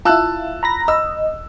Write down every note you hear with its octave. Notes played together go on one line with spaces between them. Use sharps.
E4 F4 A5 E6 F#6
A#5 B5 A#6
D#5 E6